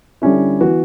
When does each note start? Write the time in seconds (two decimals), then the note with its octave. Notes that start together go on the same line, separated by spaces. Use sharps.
0.22 D3 G3 C#4 E4
0.60 E3 B3 F#4